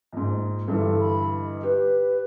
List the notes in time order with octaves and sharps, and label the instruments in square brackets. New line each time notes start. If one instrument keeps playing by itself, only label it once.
[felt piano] A#1 G#2
[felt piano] G2 D3 E3 [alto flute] A4
[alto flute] B5
D#5
[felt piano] G4 [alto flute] B4